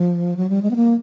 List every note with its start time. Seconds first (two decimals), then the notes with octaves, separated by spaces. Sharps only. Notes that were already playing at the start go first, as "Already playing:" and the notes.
Already playing: F3
0.37 F#3
0.49 G3
0.63 G#3
0.71 B3
0.76 A#3